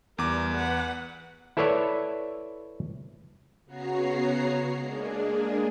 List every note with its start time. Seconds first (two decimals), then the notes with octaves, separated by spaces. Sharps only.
0.18 E2 G3 A#4 D6
0.54 B4 F#5
1.57 E4 A4 B4 C#5 D5 E5
3.65 C#3 B3 F#4 C#5 A#5 C7
4.77 G#3 A#3 D4 G#4